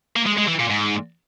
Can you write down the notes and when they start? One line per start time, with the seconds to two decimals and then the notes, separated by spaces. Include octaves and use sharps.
0.16 A#3
0.27 G#3
0.38 G#3
0.48 E3
0.59 A#2
0.70 G#2